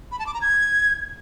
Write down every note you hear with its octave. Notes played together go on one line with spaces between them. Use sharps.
B5
A5
D6
A#5
G#6